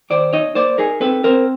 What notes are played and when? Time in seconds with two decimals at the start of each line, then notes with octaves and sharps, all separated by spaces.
0.10 D#3 C5 D5
0.33 D#4 C#5 D#5
0.55 A#3 C5 D5
0.78 D#4 G#4 A#4
1.01 C4 A4 B4
1.24 C4 A#4 C5